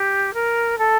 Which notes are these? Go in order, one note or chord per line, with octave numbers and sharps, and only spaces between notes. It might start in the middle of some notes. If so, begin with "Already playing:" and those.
Already playing: G4
A#4
A4